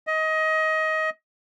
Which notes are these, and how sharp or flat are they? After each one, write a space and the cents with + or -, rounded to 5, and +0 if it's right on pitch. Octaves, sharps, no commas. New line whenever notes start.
D#5 +20